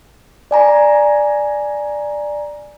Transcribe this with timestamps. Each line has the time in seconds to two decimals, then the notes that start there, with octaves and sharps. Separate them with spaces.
0.51 D5 G#5 A#5 A#6